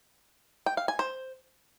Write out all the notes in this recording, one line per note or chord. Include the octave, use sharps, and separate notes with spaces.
G5
F5
G#5
C5